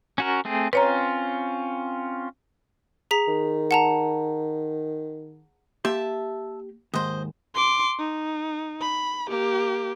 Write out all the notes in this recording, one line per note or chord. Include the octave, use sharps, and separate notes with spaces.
C#4 F#4 A#4
A3 C4 G#4
C4 C#4 F4 B4 C#5 A#5
G#4 A#5 B6
D#3
F#5 A5 A#5
A#3 G4 E5 A5 C6
D#2 G#2 C5 D#5
C6 D6
D#4
B5
A#3 G4